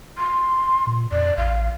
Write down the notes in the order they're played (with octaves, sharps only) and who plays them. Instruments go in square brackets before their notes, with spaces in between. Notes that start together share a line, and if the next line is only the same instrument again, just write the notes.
[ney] C6
[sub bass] A#2
[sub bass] F2 [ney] D5
[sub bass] A1 [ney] F5